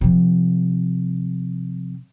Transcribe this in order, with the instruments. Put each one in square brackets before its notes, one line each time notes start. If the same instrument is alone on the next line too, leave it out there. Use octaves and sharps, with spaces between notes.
[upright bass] C3 F3